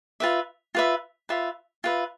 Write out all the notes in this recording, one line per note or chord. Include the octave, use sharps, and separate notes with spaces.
F4 B4 E5
F4 B4 E5
F4 B4 E5
F4 B4 E5